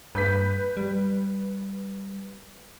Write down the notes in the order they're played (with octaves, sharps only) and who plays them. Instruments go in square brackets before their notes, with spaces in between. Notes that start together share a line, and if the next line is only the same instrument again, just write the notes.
[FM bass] G2 [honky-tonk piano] B4 G6 B6
[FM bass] G3